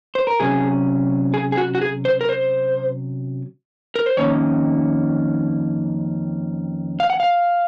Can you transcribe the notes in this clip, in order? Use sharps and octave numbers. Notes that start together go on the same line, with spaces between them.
C5
A#4
C3 F#3 C#4 G#4
G#4
G#4
F#4
F#4
G#4
C5
A#4
C5
A#4
C5
F2 D#3 A#3 C#4 C#5
F5
F#5
F5